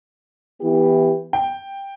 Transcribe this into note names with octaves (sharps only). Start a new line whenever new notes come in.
E3 B3 E4 G4
G5